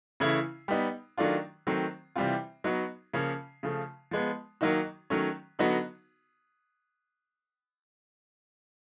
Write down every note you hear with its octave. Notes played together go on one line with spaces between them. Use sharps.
C#3 E3 A3 C#4 E4
G3 B3 D#4
D#3 F#3 A3 D4 F4
D#3 F#3 A3 C4
C3 E3 G3 C4 F4
F#3 B3 D#4 F#4
C#3 F3 A#3 C#4
C#3 F3 A3
F3 G#3 B3
D#3 F#3 A#3 D#4 F#4
D#3 F#3 A3 C#4
D3 F#3 B3 D#4 F#4